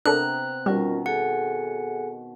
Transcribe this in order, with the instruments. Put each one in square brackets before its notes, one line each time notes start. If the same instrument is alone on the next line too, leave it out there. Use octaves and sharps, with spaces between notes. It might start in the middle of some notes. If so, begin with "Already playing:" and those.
[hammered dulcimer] C3 B3 A#5 [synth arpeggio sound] D4 A4 A#4 [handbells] F#6
[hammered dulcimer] B2 D#3 [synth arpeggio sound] G3 [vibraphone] C#4 F4 A#4
[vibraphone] G#4 A4 G#5 [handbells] F#5